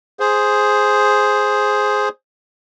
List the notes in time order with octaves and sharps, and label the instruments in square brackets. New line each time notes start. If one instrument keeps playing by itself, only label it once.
[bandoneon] G#4 C5